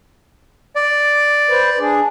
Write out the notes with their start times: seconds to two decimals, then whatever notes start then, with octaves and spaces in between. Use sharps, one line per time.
0.76 D5
1.49 B4 C5
1.79 D4 G#4